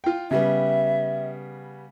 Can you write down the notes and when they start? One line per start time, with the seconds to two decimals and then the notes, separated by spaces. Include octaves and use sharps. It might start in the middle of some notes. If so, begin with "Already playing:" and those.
0.04 F4 G5
0.31 C#3 G3 B3 E5